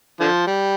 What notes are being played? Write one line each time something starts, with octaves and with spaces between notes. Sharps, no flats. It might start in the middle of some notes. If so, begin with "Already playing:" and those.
D3 F3
G3